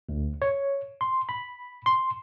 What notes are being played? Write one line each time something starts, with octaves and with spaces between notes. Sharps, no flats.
D2
C#5
C6
B5
C6